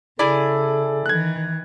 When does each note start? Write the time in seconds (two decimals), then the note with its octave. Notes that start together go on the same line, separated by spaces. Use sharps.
0.19 C#3 E4 G#4 A4 D5
1.06 D#3 E3 F#6 G#6